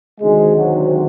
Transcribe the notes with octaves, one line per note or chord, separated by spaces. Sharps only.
D2 C3 D#3 G#3
F#3